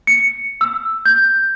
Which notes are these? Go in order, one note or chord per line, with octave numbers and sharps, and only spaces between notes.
C#7
E6
G6